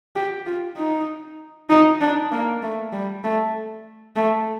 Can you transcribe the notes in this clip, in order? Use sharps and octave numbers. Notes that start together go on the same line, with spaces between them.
G4
F4
D#4
D#4
D4
A#3
A3
G3
A3
A3